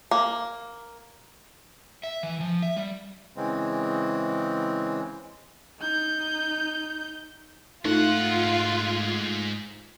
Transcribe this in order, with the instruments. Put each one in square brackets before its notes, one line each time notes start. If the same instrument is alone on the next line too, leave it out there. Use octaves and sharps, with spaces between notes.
[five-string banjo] A#3
[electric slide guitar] E5
E3
F3
E5
G3
[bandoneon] C#3 E3 G#3 C4
[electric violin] D#4 G6
[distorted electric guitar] G#2 F#5 [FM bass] A3 [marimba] D#4 [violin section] F4